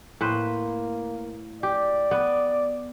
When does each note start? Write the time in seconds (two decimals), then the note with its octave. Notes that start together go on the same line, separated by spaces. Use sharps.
0.21 A2 A#3 B4 C5
1.63 G4 D5
2.11 B3